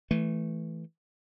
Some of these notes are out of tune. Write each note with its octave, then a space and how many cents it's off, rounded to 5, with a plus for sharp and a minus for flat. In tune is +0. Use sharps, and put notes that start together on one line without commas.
E3 +0 A3 +0